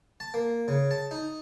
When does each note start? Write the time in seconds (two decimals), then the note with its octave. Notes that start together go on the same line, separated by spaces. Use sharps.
0.20 A5
0.34 A#3
0.68 C#3
0.91 A5
1.11 D#4